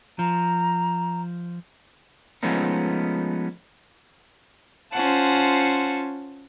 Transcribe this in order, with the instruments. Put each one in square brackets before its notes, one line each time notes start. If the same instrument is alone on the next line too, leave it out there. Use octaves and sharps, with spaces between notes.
[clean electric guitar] F3 [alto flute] A#5
[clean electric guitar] F3 G#3 A3 B3 C#4 D#4
[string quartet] C#4 F4 C5 F#5 A5